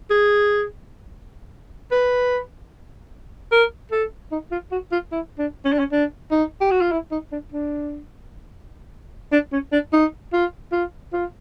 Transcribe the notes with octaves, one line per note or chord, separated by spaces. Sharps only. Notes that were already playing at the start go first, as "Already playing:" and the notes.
G#4
B4
A#4
A4
D#4
F4
F#4
F4
E4
D4
C#4
D4
C#4
D4
D#4
G4
F#4
F4
E4
D#4
D4
D4
D4
C#4
D4
D#4
F4
F4
F4